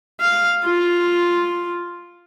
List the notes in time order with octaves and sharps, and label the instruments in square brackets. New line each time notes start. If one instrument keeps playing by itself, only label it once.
[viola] F5
F4